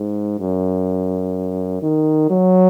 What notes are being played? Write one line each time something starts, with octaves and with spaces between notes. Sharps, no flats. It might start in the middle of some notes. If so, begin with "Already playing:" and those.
Already playing: G#2
F#2
D#3
F#3